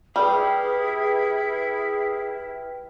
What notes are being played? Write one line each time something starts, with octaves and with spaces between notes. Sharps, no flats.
G3 G#4 B4 G5 E6 F6
E4